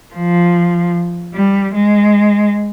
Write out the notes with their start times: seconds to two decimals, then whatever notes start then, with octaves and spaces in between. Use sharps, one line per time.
0.14 F3
1.34 G3
1.74 G#3